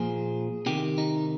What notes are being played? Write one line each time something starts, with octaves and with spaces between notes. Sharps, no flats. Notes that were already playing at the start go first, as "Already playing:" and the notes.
Already playing: A#2 F3 G#4
C3 D#3 G4
D#4